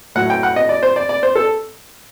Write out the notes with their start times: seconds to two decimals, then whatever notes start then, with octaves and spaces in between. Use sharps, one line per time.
0.15 A2 F#3 F#5
0.30 G5
0.43 F#5
0.56 D#5
0.69 D5
0.83 C5
0.96 D5
1.09 D5
1.23 C5
1.35 A4